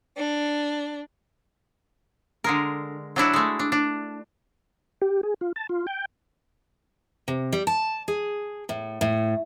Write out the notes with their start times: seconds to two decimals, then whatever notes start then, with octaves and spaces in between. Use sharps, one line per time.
0.17 D4
2.44 D3 G#3 A#4
3.16 F#3 D4 E4 F#4
3.33 G#3 A3
3.59 D4
3.72 D4
5.02 G4
5.23 G#4
5.41 F4
5.56 A5
5.69 F4
5.87 G5
7.28 C3
7.53 G3
7.67 A5
8.08 G#4
8.69 A2
9.01 A2